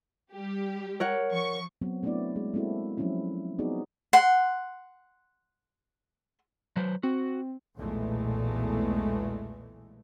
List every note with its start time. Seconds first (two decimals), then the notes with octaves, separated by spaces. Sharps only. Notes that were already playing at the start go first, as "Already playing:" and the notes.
0.31 G3 G4
1.00 A#4 C#5 F#5
1.31 F3 C#6
1.81 F#3 B3 C4 F#4
2.03 A3 B3 C4 D4 E4 D5
2.36 G#3
2.54 G#3 A#3 C4 E4 F#4 A4
2.97 F3 F#3 C4 C#4 E4
3.59 B3 C4 D#4 F#4 G#4 D5
4.13 F#5 C6
6.77 F#3 B4 C5
7.03 C4 F#4
7.76 B1 E2 A#2 E3 G#3 A3